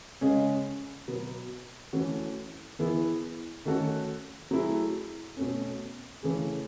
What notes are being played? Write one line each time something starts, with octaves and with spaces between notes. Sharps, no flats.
C#3 G#3 C#4 G#4
B2 F#3 B3
E3 A3 C#4 F#4
E3 B3 E4 G#4
D#3 A3 C#4 F#4 A4
F#3 A3 E4 G#4
B2 A3 C#4
C#3 E3 A3 C#4 G#4